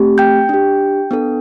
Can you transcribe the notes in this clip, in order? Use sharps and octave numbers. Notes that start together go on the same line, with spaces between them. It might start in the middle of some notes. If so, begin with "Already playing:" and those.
Already playing: A3 C4 G4
G5 G6
D4 G4
B3 D4 A4